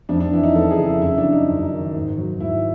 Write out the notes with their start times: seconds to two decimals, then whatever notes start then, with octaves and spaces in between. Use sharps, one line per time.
0.09 F2 D4
0.20 D4
0.32 E3 E4
0.43 D#4
0.55 F2 A4
0.71 G#4
0.79 C#3
0.86 E4
1.02 F#2 E4
1.18 D4
1.24 F#3
1.33 D#4
1.49 F#2
1.72 D#3
1.95 G#2
2.18 F#3
2.40 G#2 E4